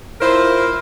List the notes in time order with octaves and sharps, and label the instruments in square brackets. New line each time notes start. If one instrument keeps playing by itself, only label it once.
[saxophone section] E4 F4 A#4 C5